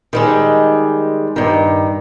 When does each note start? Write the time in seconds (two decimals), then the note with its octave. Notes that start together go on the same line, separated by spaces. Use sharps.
0.13 D#3 G3 G#3
1.36 G2 D#3